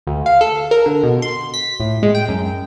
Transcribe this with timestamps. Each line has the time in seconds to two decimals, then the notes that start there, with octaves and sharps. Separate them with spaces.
0.07 D2
0.26 F5
0.41 A4
0.71 A#4
0.86 D3
1.03 B2
1.22 C6
1.54 B6
1.80 A2
2.03 G#3
2.15 G5
2.28 F#2